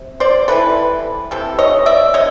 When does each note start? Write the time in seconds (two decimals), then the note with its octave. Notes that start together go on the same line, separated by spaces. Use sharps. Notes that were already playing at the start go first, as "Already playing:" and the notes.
Already playing: C3
0.20 C5 D5
0.48 C3 E3 G3 A4 B4
1.31 C3 E3 G3 A4
1.59 C#5 D#5
1.86 D5 E5
2.14 C3 C#5 D#5